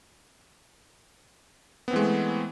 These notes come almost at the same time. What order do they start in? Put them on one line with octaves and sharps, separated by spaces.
B3 C4 E3 G#3 A3